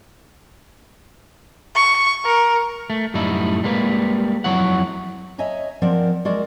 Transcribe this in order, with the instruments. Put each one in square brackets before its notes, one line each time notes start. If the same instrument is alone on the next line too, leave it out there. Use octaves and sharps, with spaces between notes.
[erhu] C#6
A#4
[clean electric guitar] A3
F#2 A2 G3 A3 D#4 E4
G3 G#3 A#3 B4
F2 F#3 E4 C#5 F#5
[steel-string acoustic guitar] C#5 D#5 E5 G#5 A#5
F3 C4 A#4 C5 D5 F#5
G#3 F#4 A#4 D5